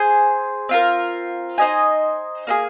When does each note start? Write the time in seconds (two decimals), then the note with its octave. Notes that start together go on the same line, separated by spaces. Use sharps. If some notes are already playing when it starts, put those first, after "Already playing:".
Already playing: G#4 C5 G#5
0.69 C4 F4 A#4
1.58 D#4 C5 D#5 G#5
2.47 A#3 D#4 G#4